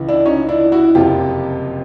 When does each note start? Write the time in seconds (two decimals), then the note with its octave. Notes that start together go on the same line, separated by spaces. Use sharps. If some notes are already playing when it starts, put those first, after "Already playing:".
Already playing: C#2 C#3 E3
0.09 D4 E4
0.26 C#4 D#4
0.48 D4 E4
0.72 E4 F#4
0.95 F#1 F2 C3 F3 F4 G4